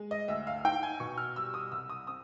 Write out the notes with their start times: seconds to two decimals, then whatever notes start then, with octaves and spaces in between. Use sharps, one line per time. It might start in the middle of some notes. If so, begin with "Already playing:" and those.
Already playing: G#3
0.11 D#5
0.28 D2 E5
0.47 F5
0.64 D#4 G5
0.83 G#5
1.00 B2 C#6
1.18 F6
1.36 G3 E6
1.54 D#6
1.72 C2 E6
1.89 D#6
2.07 C4 D#6